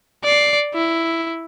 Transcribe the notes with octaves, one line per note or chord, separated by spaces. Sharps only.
D5 C7
E4